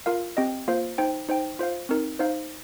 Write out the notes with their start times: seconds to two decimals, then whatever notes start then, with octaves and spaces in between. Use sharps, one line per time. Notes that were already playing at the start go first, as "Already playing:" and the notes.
0.06 F4 A#4 F5
0.37 C4 G4 D#5 G5
0.68 A#3 F4 C5 F5
0.98 D#4 C5 G5
1.29 D#4 C5 G5
1.59 F4 C5 F5
1.89 C4 D#4 A#4
2.19 D#4 C5 F5